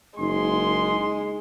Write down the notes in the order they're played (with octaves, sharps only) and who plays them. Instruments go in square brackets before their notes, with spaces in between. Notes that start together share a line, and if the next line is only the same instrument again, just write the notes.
[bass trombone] F#1 [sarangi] G#3 [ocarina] D#4 [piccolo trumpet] C6